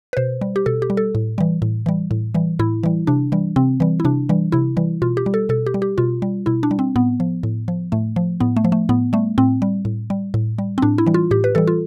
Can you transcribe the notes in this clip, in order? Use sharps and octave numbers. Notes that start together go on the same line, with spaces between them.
B4
B2 C5
G3
G4
B2 A4
G4
G3
A4
A2
E3 G3
A2
E3 G3
A2
E3 G3
A2 E4
E3 G3
C3 D4
E3 G3
C3 C4
E3 G3
E4
C3 D4
E3 G3
C3 E4
E3 G3
B2 F4
G4
G3
A4
B2 A4
G4
G3
G4
B2 F4
G3
B2 E4
D4
G3
C4
A2 B3
F3
A2
F3
A2 A3
F3
A2 B3
A3
F3
A3
A2 B3
G3 A3
A2 C4
G3
A2
G3
A2
G3
C4
A2 D4
E4
E3 G3
F4
A2 G4
B4
E3 G3 A4
F4